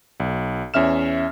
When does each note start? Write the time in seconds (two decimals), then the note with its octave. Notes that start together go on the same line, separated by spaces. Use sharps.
0.20 B1
0.74 E2 C#4 E5 F6 E7